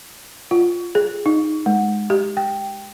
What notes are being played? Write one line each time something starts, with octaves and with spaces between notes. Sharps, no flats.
F4
G#4
D#4
G#3
G4
G5